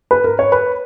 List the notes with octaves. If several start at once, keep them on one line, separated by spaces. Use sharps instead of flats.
B4
A#4
C#5
B4